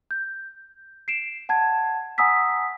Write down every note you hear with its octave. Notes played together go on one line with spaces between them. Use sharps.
G6
C7 D7 E7
F#5 A5 G#6
F#5 G#5 A#5 D#6 E6 B6